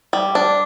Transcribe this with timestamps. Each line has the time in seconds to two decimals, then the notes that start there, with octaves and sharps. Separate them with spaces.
0.13 G3
0.35 D4